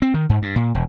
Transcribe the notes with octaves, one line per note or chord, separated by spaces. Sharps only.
C4
D#3
G#2
G2
A#2
E1